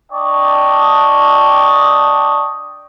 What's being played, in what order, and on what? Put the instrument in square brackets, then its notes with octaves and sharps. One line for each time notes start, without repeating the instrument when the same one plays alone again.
[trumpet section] D4 D5 D#5 G5 A5 C#6